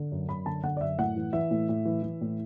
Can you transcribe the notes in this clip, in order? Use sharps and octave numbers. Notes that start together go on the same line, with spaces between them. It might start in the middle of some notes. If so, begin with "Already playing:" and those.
Already playing: D3
F#2
F#2 B5
D3 A5
D3 F#5
D5
F#2 E5
A2 F#5
E3
E3 E5
A2
A2
E3
E3
A2